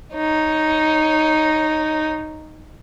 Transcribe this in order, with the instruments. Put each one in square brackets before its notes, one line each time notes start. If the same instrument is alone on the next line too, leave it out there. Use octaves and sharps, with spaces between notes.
[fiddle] D#4 C#5